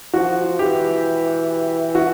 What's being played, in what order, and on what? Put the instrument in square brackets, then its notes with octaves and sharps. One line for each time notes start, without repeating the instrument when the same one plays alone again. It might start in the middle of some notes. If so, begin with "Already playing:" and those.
[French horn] F3 [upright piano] F#4
[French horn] E3 [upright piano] G4
[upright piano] F#4